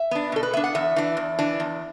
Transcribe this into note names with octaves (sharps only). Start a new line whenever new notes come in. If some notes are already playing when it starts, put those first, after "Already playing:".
Already playing: E5
B3 D4
B2 A4
B4
B3 D4 E5
F#5
E2 E5
E3 D4
E2
E3 D4
E2